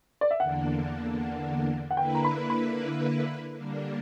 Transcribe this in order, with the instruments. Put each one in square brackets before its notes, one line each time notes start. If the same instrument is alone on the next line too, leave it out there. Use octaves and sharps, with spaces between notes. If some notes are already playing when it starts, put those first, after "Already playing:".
[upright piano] D5
E5
[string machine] E2 D3 A#3 D4 [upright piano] F#5
[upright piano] F#5
[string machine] D3 A#3 E4 B4 [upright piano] G5
[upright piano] A#5
B5
B5
[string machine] D3 G3 A#3 D4